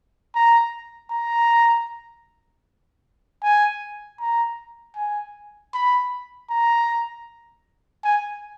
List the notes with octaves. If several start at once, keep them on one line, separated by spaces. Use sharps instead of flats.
A#5
A#5
G#5
A#5
G#5
B5
A#5
G#5